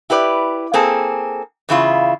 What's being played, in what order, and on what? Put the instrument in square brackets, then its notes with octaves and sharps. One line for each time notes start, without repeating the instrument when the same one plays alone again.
[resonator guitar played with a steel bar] E4 G4 B4 D5
A#3 C4 G#4 A4
E2 C#3 E4 F4